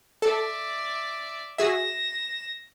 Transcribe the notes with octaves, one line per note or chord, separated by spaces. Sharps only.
A4 D5 E5
F#4 G#4 E5 A#6 E7